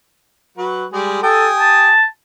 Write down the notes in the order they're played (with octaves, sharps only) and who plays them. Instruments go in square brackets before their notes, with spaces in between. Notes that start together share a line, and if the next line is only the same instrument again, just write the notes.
[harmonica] F#3 F#4 B4
G3 G#3 G#4
[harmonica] G4 G#5 D#6 [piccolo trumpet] A4
[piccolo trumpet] A5